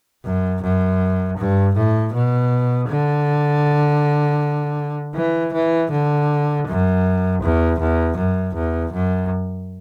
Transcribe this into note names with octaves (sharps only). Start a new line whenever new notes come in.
F#2
F#2
G2
A2
B2
D3
E3
E3
D3
F#2
E2
E2
F#2
E2
F#2